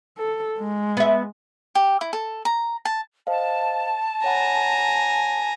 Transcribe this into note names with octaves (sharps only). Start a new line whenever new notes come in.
A4
G#3
B3 E5
G4
E4
A4
A#5
A5
C5 D#5 F5 A5
C#5 F#5 G#5 A#5 B5